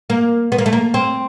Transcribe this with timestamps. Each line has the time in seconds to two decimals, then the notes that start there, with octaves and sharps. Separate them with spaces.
0.10 A#3
0.52 B3
0.58 A#3
0.66 A3
0.73 A#3
0.94 C4